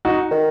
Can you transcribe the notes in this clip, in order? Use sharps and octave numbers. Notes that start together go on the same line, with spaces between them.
D#4 F#4
D#3